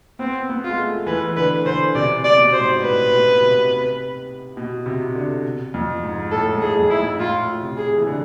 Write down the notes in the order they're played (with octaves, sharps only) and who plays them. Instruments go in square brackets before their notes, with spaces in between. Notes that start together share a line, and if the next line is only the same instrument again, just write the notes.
[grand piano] B3 [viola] C4
[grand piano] B3
[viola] F4
[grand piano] G#3
A3
[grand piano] E3 [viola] B4
[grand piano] D3 [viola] B4
[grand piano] D3 [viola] C5
[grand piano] C3 [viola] D5
[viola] D5
[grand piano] B2
[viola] C5
[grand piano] G#2
[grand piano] A2 [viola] B4
[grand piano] B2
C3
B2
C3
D3
F2
G#2
[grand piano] A2 [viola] A4
[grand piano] G#2
[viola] G#4
[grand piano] F2
[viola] E4
[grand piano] G#2
[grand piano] A2 [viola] F4
[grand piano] C3
[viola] G#4
[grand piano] E3
D3